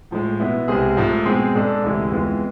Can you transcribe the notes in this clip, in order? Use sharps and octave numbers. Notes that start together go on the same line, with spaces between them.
A2 F3 G#3
B2 B3 E4
C2 C3 G#3 C4 G#4
G#2 F3 A3
B2 G#3 C4 G#4
G#2 G#3 D4 A4
D2 C3 E3 G#3
F2 E3 G#3 B3 F4